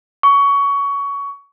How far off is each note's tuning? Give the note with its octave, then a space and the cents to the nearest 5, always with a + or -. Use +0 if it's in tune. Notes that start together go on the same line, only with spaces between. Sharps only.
C#6 +20